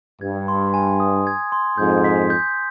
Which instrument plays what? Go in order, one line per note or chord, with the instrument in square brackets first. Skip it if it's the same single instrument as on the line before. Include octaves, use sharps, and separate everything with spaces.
[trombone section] G2 [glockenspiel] G#6
[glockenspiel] C6
G#5
D#6
G#6
C6
[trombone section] F2 G#2 [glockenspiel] G6
[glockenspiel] B6
G6